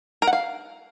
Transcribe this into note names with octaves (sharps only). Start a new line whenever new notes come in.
A#4
F#5
F5